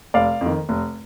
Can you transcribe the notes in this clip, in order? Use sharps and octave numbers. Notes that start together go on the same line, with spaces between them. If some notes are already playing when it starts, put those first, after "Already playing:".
F1 D5 F5
F2
D#3
F1